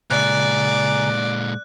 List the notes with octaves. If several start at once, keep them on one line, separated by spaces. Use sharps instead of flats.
A#2 C#3 G#3 D5 G#5 A#5 F#6